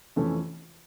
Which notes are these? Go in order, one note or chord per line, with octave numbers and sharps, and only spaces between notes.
F2 C3 E3 A3 C#4